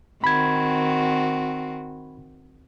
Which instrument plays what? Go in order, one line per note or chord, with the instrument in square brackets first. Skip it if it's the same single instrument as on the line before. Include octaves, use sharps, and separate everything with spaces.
[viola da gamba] D#3 C4 F#4 [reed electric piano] B5 G#6